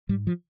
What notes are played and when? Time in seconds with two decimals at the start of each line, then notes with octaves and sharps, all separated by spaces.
0.09 G#2 G3
0.27 F3